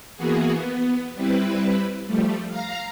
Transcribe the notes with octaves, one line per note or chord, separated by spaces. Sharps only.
E3 A#3 B3 F#4 G#4
B3
G3 C4 E4 B4
F3 G3 A3
F5 A#5